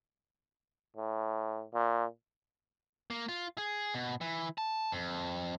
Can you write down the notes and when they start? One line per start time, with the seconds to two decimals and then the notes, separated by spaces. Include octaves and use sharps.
0.97 A2
1.74 A#2
3.10 A#3
3.29 F4
3.58 G#4
3.94 B2
4.21 E3
4.58 A5
4.92 F2